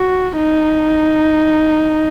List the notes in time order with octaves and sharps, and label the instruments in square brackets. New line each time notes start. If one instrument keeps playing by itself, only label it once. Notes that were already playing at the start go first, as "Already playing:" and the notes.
Already playing: [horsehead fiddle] F#4
D#4